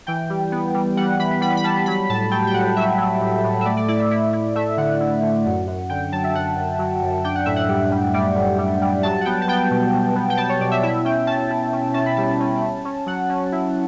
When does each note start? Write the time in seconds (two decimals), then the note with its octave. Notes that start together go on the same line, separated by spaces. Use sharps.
0.07 E3 G5
0.30 G3
0.52 B3
0.74 G3
0.97 G3 F#5
1.19 E3 B5
1.41 G3 B5
1.57 B5
1.64 G3 A5
1.86 F#3 B5
2.09 A2 A5
2.31 F#3 G5
2.47 G5
2.54 A2 F#5
2.76 F#3 E5
2.98 F#3
3.21 A2
3.44 A2
3.61 E5
3.65 A3 D5
3.77 D5
3.88 E4 D5
4.00 E5
4.11 E4
4.33 E4
4.56 A3 E5
4.77 D3 F#5
5.00 E4
5.23 D3
5.46 F#2
5.67 F#2
5.89 D3 G5
6.12 F#3 A5
6.24 E5
6.34 F#2 F#5
6.56 F#2
6.79 F#3
7.02 F#2
7.24 D4 G5
7.35 F#5
7.45 A2 E5
7.56 F#5
7.69 G3
7.92 G3
8.14 G3 D5
8.36 A2
8.58 G3
8.82 G3
9.03 F#3 A5
9.21 F#5
9.25 B3 G5
9.42 A5
9.48 B3 G5
9.71 B2
9.93 B2
10.16 B3
10.30 G5
10.37 B3 A5
10.49 C#5
10.60 B2 D5
10.71 E5
10.83 E4 E5
11.05 C#4 G5
11.27 C#4 A5
11.51 E4
11.73 C#4
11.94 C#4 A5
12.06 B5
12.17 G3 A5
12.40 C#4
12.62 C#4
12.85 C#4
13.06 F#3 F#5
13.29 C#4
13.52 E4